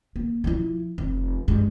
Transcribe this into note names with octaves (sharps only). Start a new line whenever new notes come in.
A#3
F3 E4
F1
G2 G#3